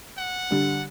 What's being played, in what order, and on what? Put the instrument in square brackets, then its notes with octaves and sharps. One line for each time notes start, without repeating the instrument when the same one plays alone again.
[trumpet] F#5
[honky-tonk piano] D3 G3